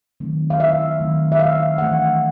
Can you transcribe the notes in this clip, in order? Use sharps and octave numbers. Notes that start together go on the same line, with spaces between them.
D#3 F#3 A3 C4
F5
E5
D#3 F#3 A3 C4
E5
F5
E3 A3 D4 F#5